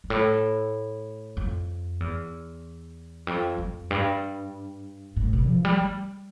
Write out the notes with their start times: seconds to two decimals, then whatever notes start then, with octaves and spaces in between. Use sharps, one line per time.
0.04 G2
0.10 A2
1.37 F2
2.00 E2
3.27 F2
3.58 F2
3.91 G2
5.17 A2
5.33 B2
5.49 F3
5.65 G3
5.80 G3